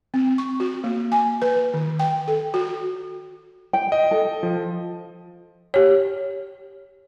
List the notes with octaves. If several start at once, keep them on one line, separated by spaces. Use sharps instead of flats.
C4
C#6
F#4
A#3
G#5
B4
D#3
G5
A4
F#4
G5
D#5
A4
F3
G4 C#5